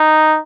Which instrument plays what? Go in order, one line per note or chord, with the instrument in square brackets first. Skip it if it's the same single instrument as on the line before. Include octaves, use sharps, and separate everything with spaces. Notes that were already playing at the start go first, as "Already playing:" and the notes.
Already playing: [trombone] D#4